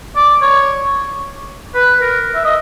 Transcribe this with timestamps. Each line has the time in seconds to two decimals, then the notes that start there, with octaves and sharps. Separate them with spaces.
0.16 D5
0.42 C#5
1.75 B4
2.01 A#4
2.36 E5
2.45 D#5